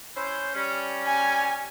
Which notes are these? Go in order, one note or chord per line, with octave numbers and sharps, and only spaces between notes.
C#4 E4 C5
G3 C#4
G#5